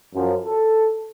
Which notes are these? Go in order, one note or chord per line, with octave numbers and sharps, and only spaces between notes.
F#2 F3
A4